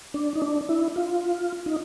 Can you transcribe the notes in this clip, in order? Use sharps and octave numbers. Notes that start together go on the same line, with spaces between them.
D4
D#4
D4
E4
F4
D#4